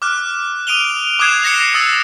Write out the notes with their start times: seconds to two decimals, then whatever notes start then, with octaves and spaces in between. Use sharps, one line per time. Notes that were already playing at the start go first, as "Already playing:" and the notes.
0.02 D6 F6 F#6
0.67 D#6 D7 D#7 F7 G7
1.19 D6 D#6 F#6 G#6 C7 E7
1.43 F#6 A#6 C7 C#7
1.74 D#6 E6 A6